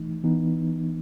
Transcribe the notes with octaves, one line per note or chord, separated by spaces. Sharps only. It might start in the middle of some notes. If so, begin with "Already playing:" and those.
Already playing: E3 A3 D#4
E3 B3 D#4